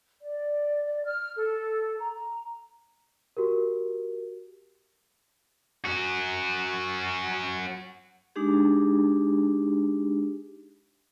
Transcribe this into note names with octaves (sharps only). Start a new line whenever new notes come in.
D5
F6
A4
A#5
F#4 G4 A#4
C#4 F#4
G#3 D4 D#4 G4 G#4